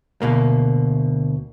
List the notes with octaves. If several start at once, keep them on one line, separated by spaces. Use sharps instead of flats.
D2 B2 A#3